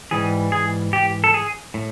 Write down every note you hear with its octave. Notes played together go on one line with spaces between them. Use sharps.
G#2 E3 G3 G#4
G#4
G4
A4
G#4
A2